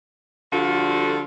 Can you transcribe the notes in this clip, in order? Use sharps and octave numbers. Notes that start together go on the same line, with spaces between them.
D3 F3 G3 F4 F#4 A4